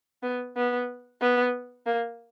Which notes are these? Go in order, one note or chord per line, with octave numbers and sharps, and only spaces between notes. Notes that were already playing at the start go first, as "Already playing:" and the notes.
B3
B3
B3
A#3